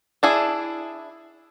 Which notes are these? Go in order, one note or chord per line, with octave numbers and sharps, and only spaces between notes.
D4 E4 G#4